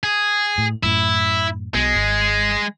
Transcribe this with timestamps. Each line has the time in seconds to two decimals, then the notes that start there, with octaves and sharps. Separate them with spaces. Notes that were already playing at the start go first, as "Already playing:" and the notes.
0.03 G#4
0.58 A2
0.83 F#2 A2 E4
1.74 B1 B2 G#3
1.95 G#1